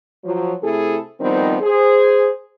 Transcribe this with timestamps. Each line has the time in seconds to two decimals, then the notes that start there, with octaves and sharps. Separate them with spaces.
0.23 F3 F#3
0.63 C3 A3 E4 G#4 A4
1.20 D#3 F3 G3 B3 C4 D#4
1.61 G#4 C5